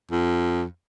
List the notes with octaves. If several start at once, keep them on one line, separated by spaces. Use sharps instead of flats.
F2